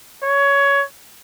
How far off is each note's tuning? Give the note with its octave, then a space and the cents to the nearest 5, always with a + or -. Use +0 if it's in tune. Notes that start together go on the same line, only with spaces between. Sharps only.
C#5 +15